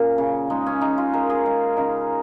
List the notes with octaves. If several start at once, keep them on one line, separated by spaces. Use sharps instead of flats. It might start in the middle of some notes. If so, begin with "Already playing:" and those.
Already playing: A#2 C#4
C#3
G#3 D#4
C#4
G#3 D#4
F4
G#3 A#4
G#4
G#3 F4
C#3 D#4